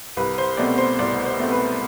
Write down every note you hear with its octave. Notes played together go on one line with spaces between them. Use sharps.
C2 B4
C5
B2 A3 C4 D5
C5
C2 D5
C5
B2 A3 C4
B4